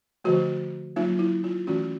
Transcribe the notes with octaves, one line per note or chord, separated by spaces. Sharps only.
D3 F3 A3 F#4
F#3 A#3 D#4 F4
E4
F4
E3 A3 C#4 F#4